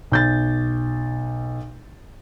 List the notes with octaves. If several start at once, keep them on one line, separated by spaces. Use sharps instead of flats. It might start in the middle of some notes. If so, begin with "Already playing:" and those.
B1 G6 A6